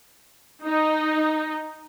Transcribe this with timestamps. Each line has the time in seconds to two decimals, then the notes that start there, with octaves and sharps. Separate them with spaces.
0.63 D#4